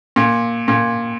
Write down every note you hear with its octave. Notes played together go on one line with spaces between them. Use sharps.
A#2
A#2